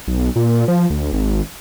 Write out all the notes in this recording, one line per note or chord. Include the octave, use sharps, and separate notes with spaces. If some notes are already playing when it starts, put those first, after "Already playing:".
B1
A#2
F3
D2
G#1